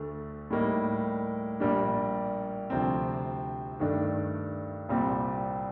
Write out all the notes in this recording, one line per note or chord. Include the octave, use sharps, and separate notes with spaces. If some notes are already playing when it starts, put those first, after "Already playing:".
Already playing: D2 D3 A3
A2 G3 A#3 D#4
A#1 A#2 G3 A#3 D4
D2 C3 F3 C4
G2 D#3 A3 D4
C2 A#2 G3 C4